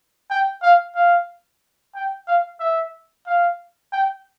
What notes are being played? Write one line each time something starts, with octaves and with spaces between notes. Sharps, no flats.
G5
F5
F5
G5
F5
E5
F5
G5